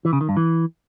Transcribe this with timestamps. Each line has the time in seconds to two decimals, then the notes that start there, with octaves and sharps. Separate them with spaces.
0.05 E3
0.13 C#3
0.21 D#3
0.29 G2
0.37 E3